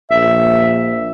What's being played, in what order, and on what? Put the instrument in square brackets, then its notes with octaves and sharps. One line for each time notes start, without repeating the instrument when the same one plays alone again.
[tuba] A#1 [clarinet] E5